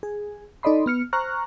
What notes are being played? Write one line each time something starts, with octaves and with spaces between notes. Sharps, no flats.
G#4
D#4 A4 D5 D#5 B5 C6
B3 F6 C#7
C5 A#5 C#6 F6 F#6